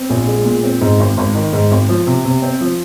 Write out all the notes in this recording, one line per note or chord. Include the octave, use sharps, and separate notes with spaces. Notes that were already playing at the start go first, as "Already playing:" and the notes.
Already playing: C4
A#1
G#3
A#2
C4
G#2
G#1
G#1
D#3
G#2
G#1
F3
C3
C3
C4
F3